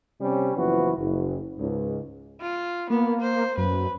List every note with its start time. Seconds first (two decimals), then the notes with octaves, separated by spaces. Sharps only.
0.21 C3 G3 C4 C#4
0.56 F#1 E3 F3 B3 F#4 B4
0.98 F#1
1.59 C#2 G#2
2.40 F4
2.90 A#3 B3
3.21 C5
3.58 F#2 B4